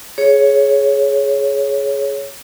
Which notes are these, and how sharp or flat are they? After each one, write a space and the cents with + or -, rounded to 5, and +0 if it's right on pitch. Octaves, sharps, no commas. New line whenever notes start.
G#4 +15 C#5 +0